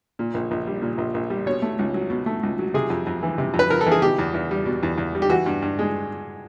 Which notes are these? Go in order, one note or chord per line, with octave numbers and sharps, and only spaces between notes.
A#2
A#1
A#1
G3
A#2
A#1
A#1
G3
B2 C#5
A3
C#2
F#3
B2
A3
C#2
F#3
C3 G#4
F2
F2
E3
C3
F2
B4
F2 A#4
A4
E3
G#4
B2 G4
E2
E2
G3
B2
E2
E2
G3
G4
E3 F#4
G2
G2
G#3